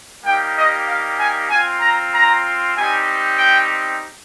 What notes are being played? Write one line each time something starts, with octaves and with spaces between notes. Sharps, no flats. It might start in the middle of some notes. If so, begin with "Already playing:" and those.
G3 A#3 D#4 G4 G5
D#5
F5
G#5
C4 F4 G#5
A#5
A#5
G3 C4 D#4 G4 G#5
G5